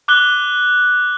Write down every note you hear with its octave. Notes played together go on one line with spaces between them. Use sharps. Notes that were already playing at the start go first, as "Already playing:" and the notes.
D6 F#6 G7